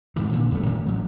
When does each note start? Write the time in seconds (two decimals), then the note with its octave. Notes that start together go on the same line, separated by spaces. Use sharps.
0.16 G#2 D#3 E3
0.33 A#2 D3
0.51 D#1 G#1 G2 A3
0.66 A2 A3 A#3 C#4
0.86 A1 F#3